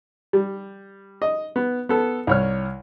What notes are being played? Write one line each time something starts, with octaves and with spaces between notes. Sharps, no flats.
G3
D#5
B3
B3 A4
C2 C#5 F6